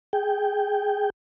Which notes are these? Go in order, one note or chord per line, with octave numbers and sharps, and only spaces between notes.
G#4 G5